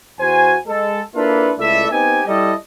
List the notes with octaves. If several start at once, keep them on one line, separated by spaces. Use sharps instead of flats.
E2 F#4 C5 G#5
G#3 A4
A#3 D4 E4 F4 A4 B4
C#2 A3 E4 A4 D5 E5
B3 C4 D#4 G4 G#5
G3 E4 G4 A4 D#5